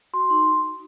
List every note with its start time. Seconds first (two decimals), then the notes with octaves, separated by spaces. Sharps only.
0.13 F#4 C6
0.30 D#4